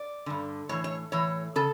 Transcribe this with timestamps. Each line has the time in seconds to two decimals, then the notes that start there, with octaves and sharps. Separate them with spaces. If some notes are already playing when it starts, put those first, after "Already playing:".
Already playing: D5
0.26 G2 D3
0.69 A2 E3 C#5
0.84 C#5
1.12 A2 E3 C#5
1.56 C#3 A4